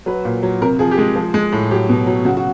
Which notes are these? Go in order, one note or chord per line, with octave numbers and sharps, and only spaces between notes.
F#3 B4
A#2
F#3
C3 A#4
F3 G#4
G4
G#3 G#4
F3
G#3
A2
F#3 G4
B2
F#3
C#3 F#4
F#4